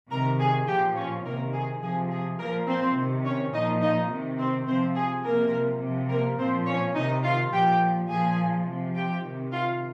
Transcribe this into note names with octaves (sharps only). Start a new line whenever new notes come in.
C3 D#3 A#4 A#5
G#4 G#5
A#2 F3 G4 G5
C#4 C#5
C3 D#3 A#3 A#4
G#4
C3 F3 G#4
G#4
A#2 F3 A#3 A#4
C4 C5
C3 D#3
C#4 C#5
A#2 F3 D#4 D#5
D#4 D#5
C3 D#3
C4 C5
C3 F3 C4 C5
G#4
C3 F3 A#3 A#4
C3 F3
A#3 A#4
A#2 F3 C4 C5
C#4 C#5
C3 D#3 D#4 D#5
F4 F5
A#2 F3 G4 G5
A#2 F3 G#4 G#5
C3 F3
G4 G5
C3 D#3
F4 F5